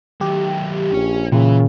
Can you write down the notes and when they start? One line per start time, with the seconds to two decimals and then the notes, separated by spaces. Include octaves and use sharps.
0.21 D#3 F#3 G4
0.92 A#1 C#4 C#5
1.32 A#2 C#3 E3